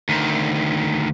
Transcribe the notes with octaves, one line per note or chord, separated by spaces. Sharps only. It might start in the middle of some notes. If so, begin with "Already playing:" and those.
D2 D#3